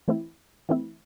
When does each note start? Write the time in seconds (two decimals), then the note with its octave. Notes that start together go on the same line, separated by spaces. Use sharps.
0.08 E3 A3 C4 E4
0.69 E3 A3 C4 E4